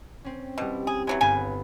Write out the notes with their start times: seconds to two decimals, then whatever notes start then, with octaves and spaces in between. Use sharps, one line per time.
0.24 C4 C#4
0.58 B2 G3 E4
0.87 G#4
1.07 E3 F#3 G#3 G#5
1.21 G1 C#3 B3 C#4 B4 G#5